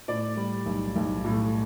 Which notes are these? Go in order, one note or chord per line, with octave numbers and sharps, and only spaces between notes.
A2 D5
G3
B1
B1
A2